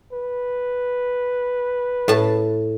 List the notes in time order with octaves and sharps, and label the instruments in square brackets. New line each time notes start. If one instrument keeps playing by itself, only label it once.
[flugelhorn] B4
[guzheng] A2 A5